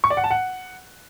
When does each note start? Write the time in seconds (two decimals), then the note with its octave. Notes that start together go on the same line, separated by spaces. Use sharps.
0.04 C#6
0.10 D5
0.17 F#5
0.24 A5
0.30 F#5